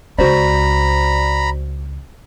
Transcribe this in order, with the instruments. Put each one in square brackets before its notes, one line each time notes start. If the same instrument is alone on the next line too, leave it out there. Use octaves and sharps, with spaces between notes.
[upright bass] C#2 D4 [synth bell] F#4 C5 D5 [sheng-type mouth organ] A#5 B5